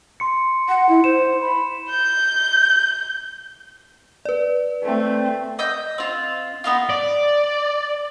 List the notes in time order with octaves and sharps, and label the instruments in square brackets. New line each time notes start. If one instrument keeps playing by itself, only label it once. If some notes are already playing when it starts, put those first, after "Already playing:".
[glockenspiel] C6 C#7
[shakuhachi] F#5
E4
[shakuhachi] C5 [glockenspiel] E7
[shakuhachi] B5
[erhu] G6
[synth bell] B4 D5
[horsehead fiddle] A3 C4
[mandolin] D#5 E6 G6
C4 F4
B3 D#4 F4
[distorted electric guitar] D5